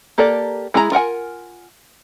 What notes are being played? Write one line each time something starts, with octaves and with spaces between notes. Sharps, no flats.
A#3 G4 A4 A#4 D5
G#3 E4 G#4 A#4 A#5
F4 A#4 F#5 G#5